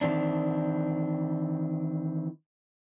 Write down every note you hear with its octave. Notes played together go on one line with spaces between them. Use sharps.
D#3 E3 C4 D4